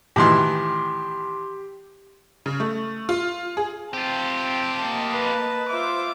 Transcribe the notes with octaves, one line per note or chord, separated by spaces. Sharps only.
A2 D#3 E3 G4 C6
C#3
A3
F4
G#4
C4 F4 G4 A5
A#3 D#5
B4
F4 C5 E5 D6